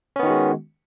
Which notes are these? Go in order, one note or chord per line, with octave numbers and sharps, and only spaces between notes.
D#3 G#3 B3 C#4 F#4